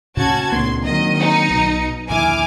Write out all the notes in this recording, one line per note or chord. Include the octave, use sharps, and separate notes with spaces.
D2 A#2 C#3 C#4 F#4 A5 G#6
C#2 A#2 A#3 C4 D4 C6
D#3 F#3 D#5
D#4 C#7
B1 B2
A#1 D#2 D3 E4 G#5 D6 F6